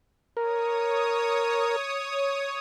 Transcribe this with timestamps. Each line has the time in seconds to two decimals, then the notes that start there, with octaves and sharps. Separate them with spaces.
0.37 A#4 C#5 D#6